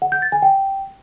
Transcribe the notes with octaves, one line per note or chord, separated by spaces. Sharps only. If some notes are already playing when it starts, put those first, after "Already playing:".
F#5
G6
A6
G#5
G5